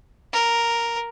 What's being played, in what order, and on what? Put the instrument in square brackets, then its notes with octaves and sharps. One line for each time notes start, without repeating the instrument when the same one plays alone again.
[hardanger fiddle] A#4